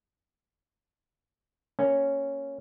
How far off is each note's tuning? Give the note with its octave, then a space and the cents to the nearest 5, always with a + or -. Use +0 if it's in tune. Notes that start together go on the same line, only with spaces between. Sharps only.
A#3 -10 C#4 +0